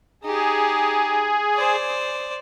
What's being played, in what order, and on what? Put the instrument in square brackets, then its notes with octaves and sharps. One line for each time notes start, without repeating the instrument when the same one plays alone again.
[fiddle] D#4 G4 [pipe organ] G#4
[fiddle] C5 D5